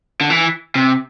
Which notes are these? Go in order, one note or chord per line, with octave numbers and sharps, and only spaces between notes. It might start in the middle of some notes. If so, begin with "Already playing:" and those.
D3
E3
C3